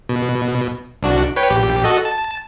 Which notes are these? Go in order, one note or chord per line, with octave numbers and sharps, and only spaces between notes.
B2
C2 D4 F#4
B4 C#5 G5
A#1 G4
F#4 A4 D#5
A5